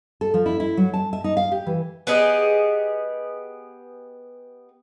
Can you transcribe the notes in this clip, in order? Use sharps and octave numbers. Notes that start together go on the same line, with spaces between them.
A4
F3
E4
E4
F#3
A5
E5
D#4
F5
G4
E3
B3 G4 G#4 D#5